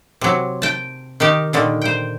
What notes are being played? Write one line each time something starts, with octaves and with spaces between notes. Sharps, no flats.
C3 F#3
G5 A5
D#3 D#4 G4
A#2 D3 D#3
C5 G5